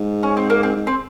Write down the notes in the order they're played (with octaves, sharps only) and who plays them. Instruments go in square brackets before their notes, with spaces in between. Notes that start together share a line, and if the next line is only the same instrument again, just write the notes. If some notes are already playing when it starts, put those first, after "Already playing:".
Already playing: [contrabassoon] G#2
[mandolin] C#4
C4
A#3
C4
[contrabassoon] G#2
[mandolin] C4